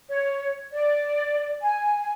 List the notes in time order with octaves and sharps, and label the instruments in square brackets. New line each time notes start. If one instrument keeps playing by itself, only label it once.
[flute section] C#5
D5
G#5